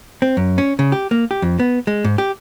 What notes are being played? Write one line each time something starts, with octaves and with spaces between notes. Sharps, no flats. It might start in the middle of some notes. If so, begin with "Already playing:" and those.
C4
F#2
C#4
C#3
G4
A#3
G4
F2
B3
G#3
G#2
G4